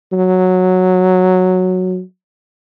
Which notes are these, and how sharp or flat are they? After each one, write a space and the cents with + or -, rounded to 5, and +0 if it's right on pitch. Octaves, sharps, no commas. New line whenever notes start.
F#3 -5